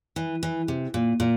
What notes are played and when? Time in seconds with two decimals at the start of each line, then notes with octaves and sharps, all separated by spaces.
0.16 E3
0.43 E3
0.68 C3
0.94 A#2
1.20 A#2